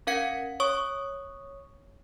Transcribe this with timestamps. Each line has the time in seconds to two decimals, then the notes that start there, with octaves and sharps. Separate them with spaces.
0.07 C#4 A#4 F5 F#5 G#6 C#7
0.60 C#5 C#6 D#6